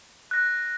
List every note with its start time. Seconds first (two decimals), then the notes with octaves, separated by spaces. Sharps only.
0.31 F#6 A#6